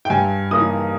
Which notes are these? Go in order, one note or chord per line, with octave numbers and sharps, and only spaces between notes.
G5
G2 G#5
E3 A#3 D#4 D#6